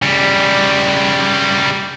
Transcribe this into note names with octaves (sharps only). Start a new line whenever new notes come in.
C#3 G3